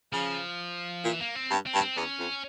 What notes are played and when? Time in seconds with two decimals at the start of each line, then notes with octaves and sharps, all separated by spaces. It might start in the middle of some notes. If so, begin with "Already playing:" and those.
0.13 C#3 F3
1.05 A#2 E3
1.20 A#3
1.35 C4
1.51 G2
1.66 C4
1.74 G2
1.81 C4
1.97 E2 C#4
2.20 F2